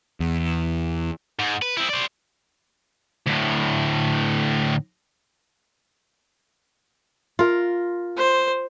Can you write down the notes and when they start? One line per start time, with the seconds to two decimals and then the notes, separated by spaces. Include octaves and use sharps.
0.20 E2
1.39 G#2
1.62 B4
1.77 C4 E4
1.89 C5 D5
3.27 D2 A2
7.39 F4 A#4
8.17 C5